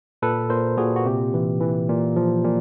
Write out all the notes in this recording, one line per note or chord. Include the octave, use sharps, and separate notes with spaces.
A#2 A4 B4
A#2 A#4 C5
A#2 F#4 G#4
F#4
C3 G4
E3
E3
A#2
F3
A#2